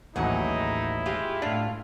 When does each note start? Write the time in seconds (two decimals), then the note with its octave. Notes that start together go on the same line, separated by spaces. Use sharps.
0.16 A1 D#2 F#3 D#4 E4 G#4 F#5
1.06 G#3 F4 G4
1.42 A2 D4 F4 F5